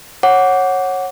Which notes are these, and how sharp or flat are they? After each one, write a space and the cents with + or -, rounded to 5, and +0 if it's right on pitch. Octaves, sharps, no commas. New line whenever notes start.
C#5 -20 F#5 +0 D6 -20